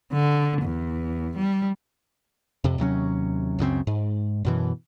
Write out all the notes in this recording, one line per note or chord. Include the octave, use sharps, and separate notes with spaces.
D3
E2
G3
F2 C3
D#2 C3 F#3 C#4
C#2 F#2 C#3 C4
G#2
F#2 B2 E3